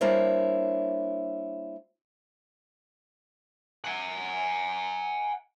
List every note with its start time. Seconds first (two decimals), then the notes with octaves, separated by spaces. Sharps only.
0.01 G3 A#3 D4 E4 C5 C#5
3.85 F#5 G#5